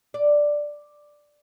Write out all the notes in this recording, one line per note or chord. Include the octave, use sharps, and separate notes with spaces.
D5